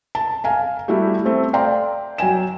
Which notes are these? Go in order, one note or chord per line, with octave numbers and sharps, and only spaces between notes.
A5
F5 G#5 A#5
G3 A3 E4 F#4 G4
A3 C4
D5 F5 G5 A#5 C6
F#3 G5 G#5 E7